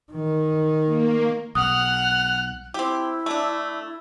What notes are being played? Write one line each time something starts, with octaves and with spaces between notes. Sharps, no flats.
D#3
A#3
B1 F#5 D#6 F6 F#6
C4 E4 G4
A3 D4